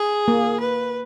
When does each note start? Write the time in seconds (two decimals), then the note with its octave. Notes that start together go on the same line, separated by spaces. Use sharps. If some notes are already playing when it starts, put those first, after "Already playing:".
Already playing: G#4
0.28 A#3
0.60 B4